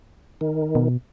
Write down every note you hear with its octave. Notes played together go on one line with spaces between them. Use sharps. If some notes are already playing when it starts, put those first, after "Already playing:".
D#3
B2